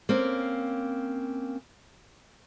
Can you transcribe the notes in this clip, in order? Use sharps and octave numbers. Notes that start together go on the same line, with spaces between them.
A#3 C4 C#4